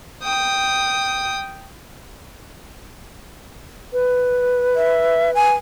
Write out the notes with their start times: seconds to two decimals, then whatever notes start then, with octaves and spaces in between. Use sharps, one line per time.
0.23 G5 D#6
3.93 B4
4.76 E5
5.35 G#5